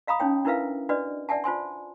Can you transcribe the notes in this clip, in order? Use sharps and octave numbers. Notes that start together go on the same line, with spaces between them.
D#5 F5 A#5 B5 D#6
C#4 D#4 C#5 G5
D4 E4 A#4 B4 E5 F5
D4 F#4 B4 D5 D#5
D5 E5 F#5 G#5 A5
F4 C5 G#5 C6